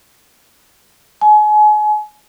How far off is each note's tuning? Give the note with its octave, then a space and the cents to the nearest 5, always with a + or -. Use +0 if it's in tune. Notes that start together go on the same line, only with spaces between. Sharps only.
G#5 +35